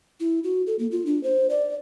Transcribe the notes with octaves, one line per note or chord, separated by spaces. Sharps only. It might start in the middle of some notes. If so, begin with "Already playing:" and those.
E4
F#4
A4
A#3
F4
D4
C5
D5